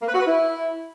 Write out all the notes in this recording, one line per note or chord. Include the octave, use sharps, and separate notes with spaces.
A#3
B4
F#4
B4
E4